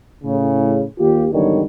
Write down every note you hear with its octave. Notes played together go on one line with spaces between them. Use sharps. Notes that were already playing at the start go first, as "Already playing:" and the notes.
A2 C#3
D#2 F4 G4
G#1 E2 D3 D#3 G3 C#5